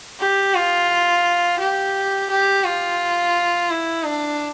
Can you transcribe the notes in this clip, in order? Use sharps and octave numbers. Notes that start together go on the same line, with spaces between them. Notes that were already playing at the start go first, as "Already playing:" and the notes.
G4
F4
G4
G4
F4
E4
D4